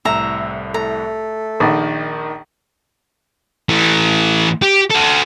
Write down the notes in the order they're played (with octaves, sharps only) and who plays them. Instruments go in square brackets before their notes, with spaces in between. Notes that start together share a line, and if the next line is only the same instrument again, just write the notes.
[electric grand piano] C2 A2 [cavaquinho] E5 A#5
[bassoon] A3 [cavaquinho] A#5
[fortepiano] A#1 [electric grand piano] D#3 D#4
[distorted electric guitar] E3 A3
G4
F#4 A4